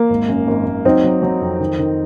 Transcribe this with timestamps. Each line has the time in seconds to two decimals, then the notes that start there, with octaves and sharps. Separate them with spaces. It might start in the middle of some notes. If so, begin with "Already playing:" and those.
Already playing: A#3
0.10 G#1
0.29 F#2
0.47 G#1
0.66 G#1
0.85 F#3 C4 D#4
1.04 F#3
1.23 F#3
1.41 F2
1.60 D#3
1.79 D#3